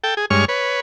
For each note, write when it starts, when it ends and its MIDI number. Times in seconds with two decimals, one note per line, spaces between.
0.04 0.15 69
0.04 0.15 79
0.17 0.25 68
0.30 0.45 43
0.30 0.45 56
0.30 0.45 73
0.30 0.45 85
0.30 0.45 89
0.48 0.80 71
0.48 0.80 73